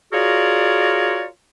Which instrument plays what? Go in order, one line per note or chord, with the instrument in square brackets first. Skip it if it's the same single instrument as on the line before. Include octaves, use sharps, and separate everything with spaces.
[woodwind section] F4 F#4 G#4 A#4 C#5 D5